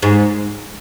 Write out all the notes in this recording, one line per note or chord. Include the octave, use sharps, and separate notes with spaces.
G#2